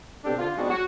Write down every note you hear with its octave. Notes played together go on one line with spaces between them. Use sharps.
B2 C4 D4 G4 A4
D3 F4
G#3 B3 C4 D4 D#4 F#4
F#4